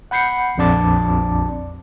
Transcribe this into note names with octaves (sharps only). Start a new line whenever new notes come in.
F#5 B5 G6 C7 C#7
A#1 F2 D4 D5 A5 D6